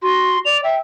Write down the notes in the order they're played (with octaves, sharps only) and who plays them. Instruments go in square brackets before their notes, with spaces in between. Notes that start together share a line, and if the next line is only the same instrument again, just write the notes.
[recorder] F#4 [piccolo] C6
[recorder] D5 [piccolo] F7
[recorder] E5 [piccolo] G5